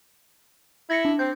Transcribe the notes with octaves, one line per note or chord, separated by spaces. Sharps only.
E4 G#6 A#6 C#7
D4
C4 G6